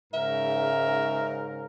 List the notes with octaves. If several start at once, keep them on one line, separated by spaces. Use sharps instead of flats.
G#2 C#3 A#4 E5